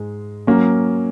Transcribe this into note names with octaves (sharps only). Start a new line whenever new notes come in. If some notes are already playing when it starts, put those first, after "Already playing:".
Already playing: G#2 G#3
F#3 A#3 C#4